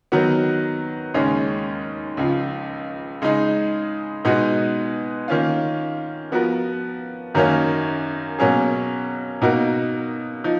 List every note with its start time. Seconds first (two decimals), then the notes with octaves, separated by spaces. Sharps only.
0.12 D#3 F#3 B3 F#4
1.14 D#2 C#3 G#3 C#4
2.17 C#2 C#3 F3
3.22 C#3 G#3 D#4
4.25 B2 G#3 B3 D#4 F#4
5.28 D#3 A#3 C#4 F4
6.32 F3 B3 F#4 A#4
7.34 F#2 D#3 F#3 A#3 C#4
8.39 B2 F#3 A#3 C#4 G#4
9.42 B2 A#3 D#4 F#4 A#4
10.44 F3 D#4